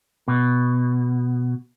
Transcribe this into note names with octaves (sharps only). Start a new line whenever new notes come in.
B2